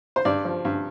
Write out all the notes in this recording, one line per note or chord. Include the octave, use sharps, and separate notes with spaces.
C5
G2 D5
F3
G2